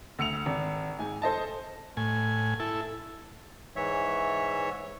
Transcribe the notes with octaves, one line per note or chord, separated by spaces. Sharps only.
D2 E6 C#7 F7
G#1
G#2 G#5
A4 C5 D#5 A5
A2 G#5
E4 A4
G#2 E3 C#5 E5